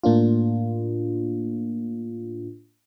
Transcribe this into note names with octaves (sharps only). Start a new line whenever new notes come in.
A2 A#3 D4 F4